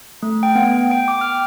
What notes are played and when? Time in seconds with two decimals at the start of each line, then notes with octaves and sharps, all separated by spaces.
0.23 A3
0.43 G5
0.55 B3
0.91 G5
1.08 D6
1.21 F6